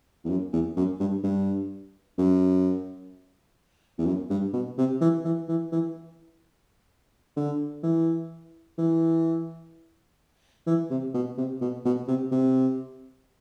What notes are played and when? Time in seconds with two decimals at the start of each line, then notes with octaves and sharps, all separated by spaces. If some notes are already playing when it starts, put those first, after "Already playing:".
0.25 E2
0.30 F#2
0.53 E2
0.77 F#2
1.00 G2
1.24 G2
2.18 F#2
3.99 E2
4.07 F#2
4.30 G2
4.54 B2
4.78 C3
5.01 E3
5.25 E3
5.49 E3
5.72 E3
7.37 D3
7.84 E3
8.78 E3
10.67 E3
10.91 C3
11.14 B2
11.38 C3
11.61 B2
11.86 B2
12.08 C3
12.32 C3